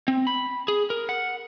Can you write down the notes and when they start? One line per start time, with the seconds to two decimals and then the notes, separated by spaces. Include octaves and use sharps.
0.08 C4
0.27 B5
0.68 G#4
0.90 A#4
1.09 F#5